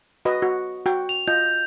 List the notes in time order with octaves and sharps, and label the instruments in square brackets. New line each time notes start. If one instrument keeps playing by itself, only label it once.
[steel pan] F#4 B4 D#5
F#4
F#4 G5
[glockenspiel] F7
[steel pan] F4 D#5 [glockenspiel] G6